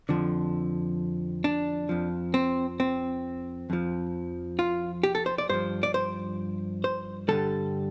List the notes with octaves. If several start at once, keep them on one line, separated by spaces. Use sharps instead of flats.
F2 D3 F3
D4
F2 F3
C4
C4
F2 F3
F4
G4
A4
C5
D5
G2 F3 C5
D5
C5
C5
G2 D3 G3 A4